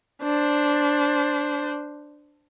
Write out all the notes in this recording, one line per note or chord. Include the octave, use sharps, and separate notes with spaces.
D4 C5